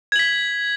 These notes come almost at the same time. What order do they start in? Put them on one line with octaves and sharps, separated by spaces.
G#6 F#7 B6